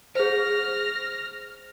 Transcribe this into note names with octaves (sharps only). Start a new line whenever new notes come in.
G#4 C5 F6 A#6